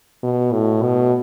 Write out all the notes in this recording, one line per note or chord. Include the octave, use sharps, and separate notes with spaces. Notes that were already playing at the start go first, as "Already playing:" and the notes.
B2
A2
B2